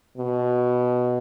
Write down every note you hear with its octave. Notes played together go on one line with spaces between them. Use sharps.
B2